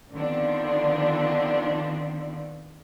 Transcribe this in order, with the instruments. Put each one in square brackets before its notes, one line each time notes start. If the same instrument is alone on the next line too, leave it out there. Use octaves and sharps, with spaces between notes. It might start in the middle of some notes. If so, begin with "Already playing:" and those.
[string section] D3 D#3 F3 B3 C4 D4